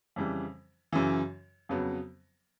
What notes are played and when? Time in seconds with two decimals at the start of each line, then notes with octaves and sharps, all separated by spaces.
0.16 F2 C#3 E3 G3
0.92 F#2 C#3 E3
1.69 F2 C#3 F#3 B3